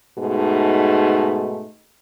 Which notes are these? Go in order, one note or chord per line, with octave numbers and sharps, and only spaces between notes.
G#2 B2 G#3 A3 D#4